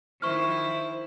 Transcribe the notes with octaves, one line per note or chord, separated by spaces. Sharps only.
D#3 F3 E4 C5 C#6 F6